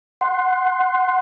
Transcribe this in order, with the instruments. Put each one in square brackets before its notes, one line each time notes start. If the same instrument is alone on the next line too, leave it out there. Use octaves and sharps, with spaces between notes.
[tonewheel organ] F#5 C6